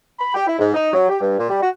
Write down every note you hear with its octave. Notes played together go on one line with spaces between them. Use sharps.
B5
G4
E4
G#2
D#4
F#3
G4
G2
A#2
G3
F#4